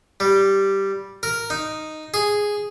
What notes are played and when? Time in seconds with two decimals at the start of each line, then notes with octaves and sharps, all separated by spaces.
0.20 G3
1.23 A#4
1.50 D#4
2.14 G#4